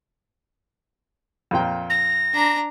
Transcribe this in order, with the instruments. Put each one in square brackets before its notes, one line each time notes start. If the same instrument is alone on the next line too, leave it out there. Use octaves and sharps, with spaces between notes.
[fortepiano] F2 A#2 G5
[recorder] A#6
[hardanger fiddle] D4 A#5